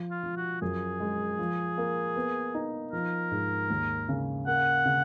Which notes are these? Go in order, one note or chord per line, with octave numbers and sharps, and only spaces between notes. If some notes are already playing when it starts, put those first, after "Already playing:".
Already playing: F3
F4
F3
F#4
F#2 G#4
G#3
F3
A#3
B3
D#4
F3 A#4
G#2
D#2
C#3
A#3 F#5
C#3